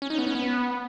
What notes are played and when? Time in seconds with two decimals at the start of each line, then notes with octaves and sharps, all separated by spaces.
0.02 C#4
0.10 D#4
0.18 B3
0.27 C#4
0.35 B3